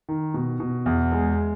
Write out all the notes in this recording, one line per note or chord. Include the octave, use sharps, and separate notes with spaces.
D#3
B2
B2
E2
G#3